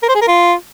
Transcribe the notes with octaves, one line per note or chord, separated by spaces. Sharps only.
A#4
C5
G#4
A#4
F4